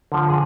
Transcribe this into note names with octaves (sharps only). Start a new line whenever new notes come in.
D3 F3
G#4